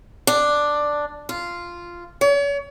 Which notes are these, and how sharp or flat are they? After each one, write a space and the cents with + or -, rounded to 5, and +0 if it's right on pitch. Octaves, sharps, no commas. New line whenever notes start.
D4 +5
F4 -5
C#5 +40